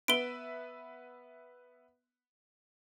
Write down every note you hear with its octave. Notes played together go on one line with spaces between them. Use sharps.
B3 B4 E5 D7 G7